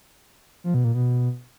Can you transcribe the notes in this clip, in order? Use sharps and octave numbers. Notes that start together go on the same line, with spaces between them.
F3
B2
A#2
B2